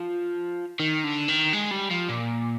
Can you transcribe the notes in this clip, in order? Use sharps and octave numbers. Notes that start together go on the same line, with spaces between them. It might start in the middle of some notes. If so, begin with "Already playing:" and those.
Already playing: F3
D#3
D3
D#3
G#3
G3
F3
A#2